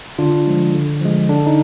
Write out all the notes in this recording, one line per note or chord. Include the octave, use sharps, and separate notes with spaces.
D3 D4 F4
F3 G#3
D3
F3 G#3
D3 D4
D#4